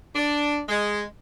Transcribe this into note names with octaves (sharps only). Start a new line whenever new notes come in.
D4
G#3